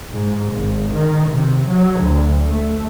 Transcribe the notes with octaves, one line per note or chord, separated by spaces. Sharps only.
G#2
G#1
D#3
C3
F#3
D2
A3